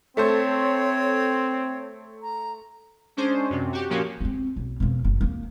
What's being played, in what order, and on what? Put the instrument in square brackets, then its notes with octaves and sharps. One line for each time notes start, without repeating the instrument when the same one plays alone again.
[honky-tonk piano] A3 A4 C5 [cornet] C4 [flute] C#5
[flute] A#5
[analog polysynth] G#3 C#4 D4 C5
F#2 C3
F#4 G4
A#2 F3 A#3 C#4 F#4 G4
[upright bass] C4 C#4
B1
F2 B2
F#1
D#2 A#3